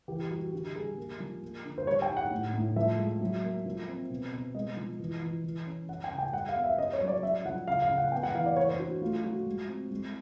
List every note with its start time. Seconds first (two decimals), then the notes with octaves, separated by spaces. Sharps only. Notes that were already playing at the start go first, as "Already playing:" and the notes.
0.08 E3 G4
0.31 G3 F#4
0.53 D3 G4
0.75 G3 G#4
0.97 A#3
1.20 F3
1.42 A#3
1.65 D3
1.78 C5
1.87 G3 C#5
2.02 G5
2.09 D#4
2.17 F#5
2.31 A2
2.54 A2
2.76 F3 E5
2.99 G#3
3.21 F#3
3.43 A#3
3.66 F3
3.88 C4
4.10 B2
4.33 B2
4.55 G#3 D#5
4.77 F3
5.00 E3
5.22 E3
5.44 E3
5.66 C#4
5.89 C#4 F#5
6.04 G5
6.11 C#3
6.18 G5
6.33 G3 F#5
6.49 F5
6.56 B3
6.64 E5
6.78 C#4 D#5
6.93 C#5
7.01 F#3
7.08 D5
7.23 C#4 E5
7.45 F3 F#5
7.68 C#3 F5
7.82 F5
7.90 C#3
7.98 F#5
8.12 B3 G5
8.23 F#5
8.34 E3 F5
8.46 D5
8.56 A#3 C#5
8.68 C5
8.79 D4 F#4
9.02 A3 F4
9.24 F3 F#4
9.46 G#3
9.68 C4
9.91 G#3